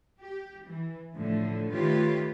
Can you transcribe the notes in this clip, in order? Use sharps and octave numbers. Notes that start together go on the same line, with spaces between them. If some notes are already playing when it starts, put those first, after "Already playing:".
G4
E3
A2 D3 F3
D#3 A3 F4 G4 B4 C#5